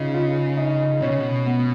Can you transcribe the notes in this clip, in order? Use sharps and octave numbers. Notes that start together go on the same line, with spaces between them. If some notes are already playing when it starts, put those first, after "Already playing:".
Already playing: C#3 D#4 F4
F4
D#4
B2 C#4
C#3
B2
B3